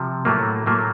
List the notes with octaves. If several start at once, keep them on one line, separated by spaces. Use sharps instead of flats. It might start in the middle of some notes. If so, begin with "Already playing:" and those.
Already playing: C3 F3
A2 F#3 A3 A#3
A2 F#3 A3 A#3